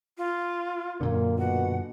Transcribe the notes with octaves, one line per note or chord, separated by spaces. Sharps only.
F4
F#2 A#2 D3 A#3
B2 F#5